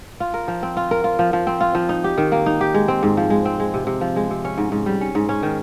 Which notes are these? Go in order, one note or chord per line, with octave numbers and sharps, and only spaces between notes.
F4
A#4
F3
C4
F4
A#4
F4
F3
F3
C4
F4
F3
D#4
G4
D#3
A#3
D#4
G4
G#3
C4
G#2
F3
G#3
C4
G#3
C3
C3
F3
G#3
C3
C#4
G#2
G#2
G3
C#4
G#2
C#4
D#3